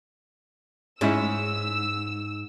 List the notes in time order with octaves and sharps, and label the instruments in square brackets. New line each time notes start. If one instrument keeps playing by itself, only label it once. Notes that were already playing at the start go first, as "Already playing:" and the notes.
[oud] G#2 [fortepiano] G#3 C#4 E4 [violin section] E6